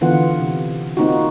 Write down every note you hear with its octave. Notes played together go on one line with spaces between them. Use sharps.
D3 E3 B3 F4 F#5
C3
A#3 C4 D#4 F4 F#4